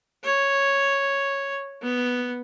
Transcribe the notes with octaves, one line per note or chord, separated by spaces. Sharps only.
C#5
B3